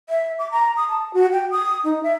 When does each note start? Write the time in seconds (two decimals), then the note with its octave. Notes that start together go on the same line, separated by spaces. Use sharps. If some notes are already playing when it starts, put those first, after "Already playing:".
0.09 E5
0.39 D6
0.51 A#5
0.77 D#6
0.89 A5
1.14 F#4
1.33 G5
1.51 D#6
1.85 D#4
2.03 E5